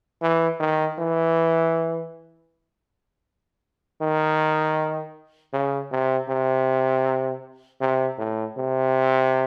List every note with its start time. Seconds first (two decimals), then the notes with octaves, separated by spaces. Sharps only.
0.22 E3
0.60 D#3
0.99 E3
4.02 D#3
5.53 C#3
5.92 C3
6.29 C3
7.81 C3
8.19 A2
8.58 C3